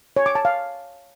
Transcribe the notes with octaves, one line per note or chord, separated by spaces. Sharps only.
C#5
D6
A5
F5